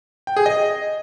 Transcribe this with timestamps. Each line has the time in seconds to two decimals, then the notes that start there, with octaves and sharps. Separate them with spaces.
0.27 G5
0.37 G#4
0.46 D#5